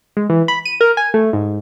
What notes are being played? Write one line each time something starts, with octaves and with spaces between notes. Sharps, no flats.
G#3
E3
B5
D#7
A#4
G#5
A3
G#2